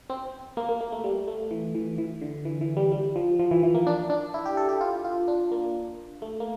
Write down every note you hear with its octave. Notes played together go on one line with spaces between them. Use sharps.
C4
A#3
A#3
A#3
A3
G3
A3
E3
E3
E3
D3
E3
E3
G3
G3
F3
F3
E3
E3
A#3
D4
D4
E4
G4
A4
G4
F4
F4
D4
A#3
A3
A#3